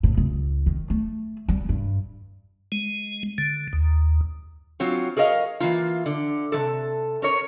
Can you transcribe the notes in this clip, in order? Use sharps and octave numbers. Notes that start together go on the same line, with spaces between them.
A2
C#2
D#3
A3
G3
G2
G#3
D3
D#2
F#3 C4 F4
G#4 A#4 C#5 D#5 F5
E3 A#3 F4
D3
C3 F3 A4
C#4 A#4 C#5